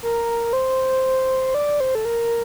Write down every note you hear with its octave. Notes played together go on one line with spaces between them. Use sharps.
A#4
C5
D5
C5
A4
A#4